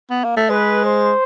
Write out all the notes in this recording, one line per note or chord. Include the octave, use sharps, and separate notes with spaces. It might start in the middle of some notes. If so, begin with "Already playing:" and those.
B3
A#3
A3
G#3 B4
C5